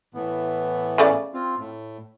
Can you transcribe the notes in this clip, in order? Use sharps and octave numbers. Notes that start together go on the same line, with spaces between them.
A2 E3 B3
C#3 A3 D5
C4 F4
A2